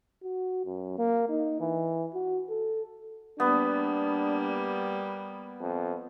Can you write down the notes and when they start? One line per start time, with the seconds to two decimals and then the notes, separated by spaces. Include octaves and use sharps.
0.24 F#4
0.66 F#2
0.99 A#3
1.29 D#4
1.61 E3
2.14 F#4
2.49 A4
3.40 G3 A#3 B3 D4
5.61 F2